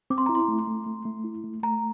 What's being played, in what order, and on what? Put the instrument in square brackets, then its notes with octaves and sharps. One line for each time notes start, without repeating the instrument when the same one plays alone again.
[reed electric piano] C4 [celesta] D6
[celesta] C6
[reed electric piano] E4 [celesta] A#5
[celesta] C6
[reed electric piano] A3
A3
A3
A3
E4
A3
[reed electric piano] A3 [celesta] A#5